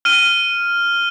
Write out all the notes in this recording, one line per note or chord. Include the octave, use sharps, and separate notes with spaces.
F6 D#7